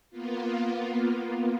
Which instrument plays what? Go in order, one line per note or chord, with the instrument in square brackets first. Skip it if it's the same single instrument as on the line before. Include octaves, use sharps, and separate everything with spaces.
[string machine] A#3 B3 F4